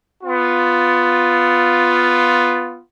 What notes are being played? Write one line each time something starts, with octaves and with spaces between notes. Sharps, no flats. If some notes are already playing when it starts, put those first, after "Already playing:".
B3 F4